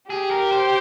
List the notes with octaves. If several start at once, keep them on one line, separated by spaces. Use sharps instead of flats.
G4 G#4
A#4
C5